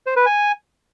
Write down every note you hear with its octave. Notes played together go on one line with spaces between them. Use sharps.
C5
B4
G#5